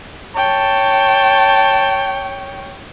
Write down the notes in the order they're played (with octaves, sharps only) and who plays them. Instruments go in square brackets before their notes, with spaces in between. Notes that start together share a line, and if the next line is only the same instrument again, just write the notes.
[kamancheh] C#5 G5 [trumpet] A5